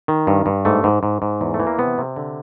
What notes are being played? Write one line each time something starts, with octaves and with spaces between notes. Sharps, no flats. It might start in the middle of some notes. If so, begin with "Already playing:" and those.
D#3
G2
G2
G#2 A3
G#2
G#2
G#2
E2
A3
E3
A#3
C3 B3
C3
D3